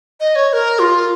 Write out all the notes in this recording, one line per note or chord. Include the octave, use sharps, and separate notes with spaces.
D#5
C#5
C#5
A#4
F4